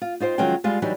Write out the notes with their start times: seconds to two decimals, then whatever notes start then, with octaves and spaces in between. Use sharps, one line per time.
0.01 F4
0.20 D#4 F4 C5 G5
0.38 D#3 F3 F#3 G#3 C#4 G5
0.64 G3 G#3 F4
0.82 E3 F#3 G3 D4 D#4